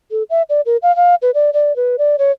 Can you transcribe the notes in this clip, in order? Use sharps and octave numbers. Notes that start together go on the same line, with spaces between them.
A4
E5
D5
A#4
F5
F5
B4
D5
D5
B4
D5
C#5